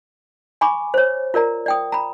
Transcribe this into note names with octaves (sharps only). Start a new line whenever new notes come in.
G#5 B5 C#6 D6
C5 C#5
F4 A#4 D5 A#5
D5 G5 D#6
A#5 B5